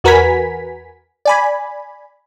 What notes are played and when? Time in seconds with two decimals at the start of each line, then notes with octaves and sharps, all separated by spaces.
0.04 E2 F#4 A#4 B4 G#5 B6
1.25 D5 G#5 B5